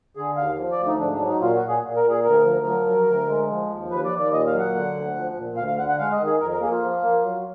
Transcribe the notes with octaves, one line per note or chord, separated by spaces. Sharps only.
D3 G#4
D#2 F5
F3
D5
D2
D#4
G#2 D4
D4
F#3
D#4
A#2 F4
F#4
A#2
G#4
A#2
A#4
A#2
G#4
D2 A#4
F3
F#3
F#3
D2
G#3
F3
D#2
D#2 B4
D5
D#2
D5
A#2 D#5
F5
F#3
F#5
D3
D2
F3
A#2
D2 F5
F5
D3 F#5
F#5
G#3 F5
D#5
D#3
G#4
F2 A#4
A#4
A#3 G#4
F4
F3
A#3
F#3